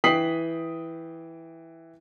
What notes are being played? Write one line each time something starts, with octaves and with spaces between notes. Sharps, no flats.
E3 G5 D#6 B6 C7 F#7